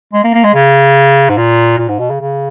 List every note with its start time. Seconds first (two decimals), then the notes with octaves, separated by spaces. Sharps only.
0.13 G#3
0.24 A#3
0.34 A#3
0.44 G#3
0.54 C#3
1.29 G#2
1.37 A#2
1.78 A#2
1.88 G#2
1.99 B2
2.10 C#3
2.21 C#3